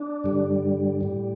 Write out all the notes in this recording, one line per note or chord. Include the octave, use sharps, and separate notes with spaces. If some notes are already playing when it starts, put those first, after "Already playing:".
Already playing: D4
G2 D3 G3
A2 G3